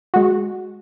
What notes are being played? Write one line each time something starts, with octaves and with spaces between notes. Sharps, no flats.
G#3 F#4